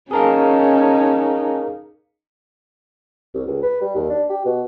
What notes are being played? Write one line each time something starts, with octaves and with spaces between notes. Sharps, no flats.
C#4 D#4 G#4 A#4 F5 A5
C2
C#2
B4
G3
D#2
D4
G4
B2